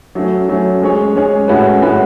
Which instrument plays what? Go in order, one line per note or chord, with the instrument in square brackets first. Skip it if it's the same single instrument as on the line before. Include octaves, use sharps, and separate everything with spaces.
[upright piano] F#3 A3 C#4
F#3 A3 C#4
G#3 C#4 G#4 C#5
G#3 C#4 G#4 C#5
A2 G#3 C#4 F#4 B4
A2 G#3 C#4 F#4 B4